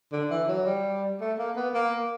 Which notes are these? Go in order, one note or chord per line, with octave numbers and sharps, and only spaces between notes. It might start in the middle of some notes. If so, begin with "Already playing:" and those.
D3
E3
F#3
G3
A3
A#3
B3
A#3